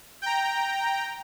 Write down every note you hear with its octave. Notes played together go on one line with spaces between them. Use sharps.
G5 A#5